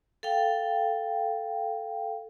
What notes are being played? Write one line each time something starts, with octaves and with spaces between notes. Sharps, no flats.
A4 F5 G5